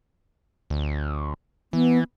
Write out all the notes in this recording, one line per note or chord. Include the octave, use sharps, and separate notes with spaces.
D2
E3 B3